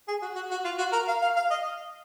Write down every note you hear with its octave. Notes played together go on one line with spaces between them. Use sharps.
G#4
F#4
F#4
F#4
F4
F#4
A#4
F5
F5
F5
D#5